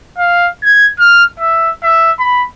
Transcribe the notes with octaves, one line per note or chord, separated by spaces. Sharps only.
F5
G#6
F6
E5
E5
B5